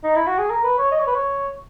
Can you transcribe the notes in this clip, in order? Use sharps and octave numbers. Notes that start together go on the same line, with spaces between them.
D#4
E4
F#4
G#4
A#4
B4
C#5
D#5
C#5
B4
C#5